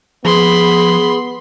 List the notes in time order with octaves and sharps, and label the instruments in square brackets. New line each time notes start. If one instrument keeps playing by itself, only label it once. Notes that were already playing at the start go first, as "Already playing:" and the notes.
[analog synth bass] F3 [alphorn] B3 [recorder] G#4 [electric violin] B5 C6